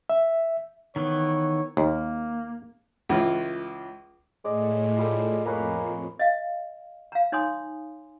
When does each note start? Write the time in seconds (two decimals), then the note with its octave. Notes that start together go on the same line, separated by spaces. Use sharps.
0.10 E5
0.96 D#3 E3 B3 C#5
1.77 D#2 A#3
3.09 C#2 E3 F4
4.45 A2 G#3 D5 D#5
4.97 F3 G3 A4
5.46 F2 G#3 A#3 B4 C#5
6.19 D#5 F5
7.12 F5 A#5
7.32 D#4 C#5 G#5 C6 D#6